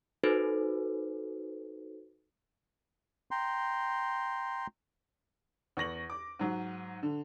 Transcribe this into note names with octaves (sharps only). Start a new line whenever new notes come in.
D#4 F#4 A4 B4 C5
G5 A#5 C6
E2 C#6 A#6 F#7
D6
G#2 F#3
D3